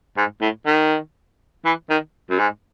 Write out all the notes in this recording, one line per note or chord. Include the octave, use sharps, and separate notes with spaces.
G#2
A2
D#3
E3
D#3
F#2
G#2